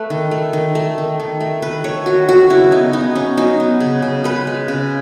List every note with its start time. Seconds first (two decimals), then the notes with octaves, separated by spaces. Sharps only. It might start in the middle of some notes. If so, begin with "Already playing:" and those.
Already playing: A3 B4
0.10 D#3
0.31 A3
0.53 D#3
0.75 A3
0.98 D#3
1.20 D#3
1.40 A3
1.62 D#3 B4
1.84 A3 C#5
2.06 D#3 F#4
2.29 F#3 F#4
2.50 C#3 E4
2.71 B3 D#4
2.93 B3 D#4
3.15 B3 C#4
3.37 F#3 D#4
3.60 B3
3.80 C#3
4.02 C#3
4.24 G#3 B4
4.47 G#3
4.68 C#3